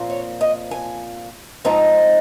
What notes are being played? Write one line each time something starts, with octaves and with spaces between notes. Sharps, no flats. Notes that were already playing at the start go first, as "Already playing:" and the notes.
Already playing: A#2 F3 C4
C#5
D#5
G#5
G#2 F3 C4 D#4 A#5